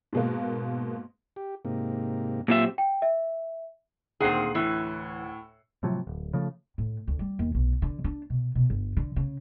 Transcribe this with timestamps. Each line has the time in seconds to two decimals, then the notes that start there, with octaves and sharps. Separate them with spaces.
0.13 G#2 B2 A#3
1.36 G4
1.65 G#2 C3 A#3
2.48 A#2 F#3 C4 F4 G4 E5
2.78 G5
3.02 E5
4.20 D2 A#2 D#3 C4 G#4 F#5 C7
4.55 A2 E3
5.83 A2 C3 F3 F#3
6.07 D1
6.33 C#3 F3 A3
6.78 A2
7.07 D2
7.19 G3
7.39 D#2
7.55 B1
7.82 D3
8.04 D4
8.30 B2
8.55 B2
8.70 G1
8.97 D3
9.16 C#3